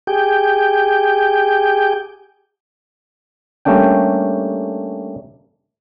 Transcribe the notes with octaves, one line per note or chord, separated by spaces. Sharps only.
G4 G#4 G5
G3 A3 A#3 C#4 D4 G5